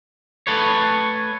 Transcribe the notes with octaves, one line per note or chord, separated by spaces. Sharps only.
A3 A4 B4 C#5